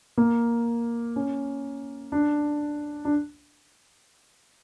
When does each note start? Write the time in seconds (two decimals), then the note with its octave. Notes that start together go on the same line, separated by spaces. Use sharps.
0.17 A#3
1.16 C#4
2.12 D4
3.05 D4